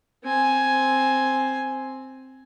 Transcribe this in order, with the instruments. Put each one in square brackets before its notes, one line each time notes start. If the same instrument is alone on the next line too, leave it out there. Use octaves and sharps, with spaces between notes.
[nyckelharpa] C4 G#5